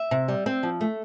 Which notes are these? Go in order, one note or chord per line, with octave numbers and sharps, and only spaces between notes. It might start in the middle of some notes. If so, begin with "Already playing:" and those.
Already playing: E5
C3
G3
C4
F3
A3